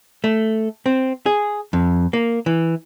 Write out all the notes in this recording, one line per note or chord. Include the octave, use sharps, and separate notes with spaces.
A3
C4
G#4
F2
A#3
E3